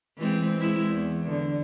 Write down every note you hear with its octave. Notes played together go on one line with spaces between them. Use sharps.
E3 G#3 C4
G#3 E4
E2
D3